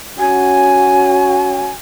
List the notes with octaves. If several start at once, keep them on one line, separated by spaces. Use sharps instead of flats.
C#4 F#4 G#5